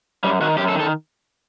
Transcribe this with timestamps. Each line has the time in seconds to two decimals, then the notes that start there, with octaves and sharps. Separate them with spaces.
0.24 F#2 G3
0.41 D#3 F#4
0.58 F#2 G4
0.68 A4
0.75 D#3
0.80 A4